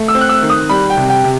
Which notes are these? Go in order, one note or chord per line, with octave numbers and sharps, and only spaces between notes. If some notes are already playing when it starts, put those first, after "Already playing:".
Already playing: A3
E6
C4
F#6
E6
D#3
D#6
G3 B5
G5
C3
G5
C3